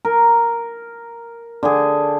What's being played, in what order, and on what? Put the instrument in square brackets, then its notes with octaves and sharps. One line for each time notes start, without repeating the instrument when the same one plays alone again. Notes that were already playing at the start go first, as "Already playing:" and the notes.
[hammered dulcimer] A#4
D3 D4 G#4